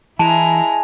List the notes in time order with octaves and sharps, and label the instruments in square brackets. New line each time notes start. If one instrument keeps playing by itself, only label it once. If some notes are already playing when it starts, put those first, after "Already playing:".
[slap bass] E3 [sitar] G#3 [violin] E4 A#5 [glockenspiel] A5